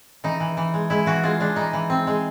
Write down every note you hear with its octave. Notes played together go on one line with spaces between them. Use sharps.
E3 D#4
E3
E3
G#3
G#3 E4
E3 F#4
G#3 F4
G#3 D4
E3 D#4
E3
C4
G#3